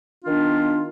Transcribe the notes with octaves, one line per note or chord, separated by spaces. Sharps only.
D#3 B3 D4 F4